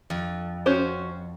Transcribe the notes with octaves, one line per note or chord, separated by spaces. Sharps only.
F2
C#4 F#4 C5